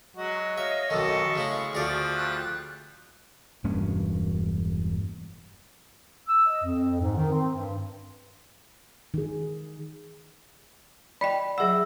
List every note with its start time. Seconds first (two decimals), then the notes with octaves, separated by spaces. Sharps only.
0.17 F#3 G#3 F#4 D#5
0.58 C#5 E5 F5
0.90 B1 F2 D#3 G#3 B3 A4 C#6
1.36 C#3 A3 E4
1.73 D2 F3 A3 G#4 D5 F5
2.16 G3 F#6
3.64 E1 G2 A#3 C#4
6.27 E6
6.46 D#5
6.63 F2
7.00 G#2
7.16 D#3
7.31 C4
7.53 G2
9.14 D#3 G#4
11.21 D5 D#5 G5 B5
11.58 F#3 G#4 E5 F#5 E6